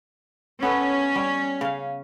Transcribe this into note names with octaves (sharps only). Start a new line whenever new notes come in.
B3 C#4 A4 B4
G3
C#3 F5